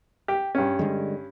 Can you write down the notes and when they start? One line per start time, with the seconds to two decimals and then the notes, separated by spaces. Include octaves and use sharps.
0.28 G4
0.55 G2 C#4
0.79 D3 G3 G#3